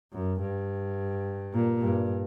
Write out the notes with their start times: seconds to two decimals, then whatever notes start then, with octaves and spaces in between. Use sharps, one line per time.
0.13 F#2
0.41 G2
1.53 A#2
1.81 G2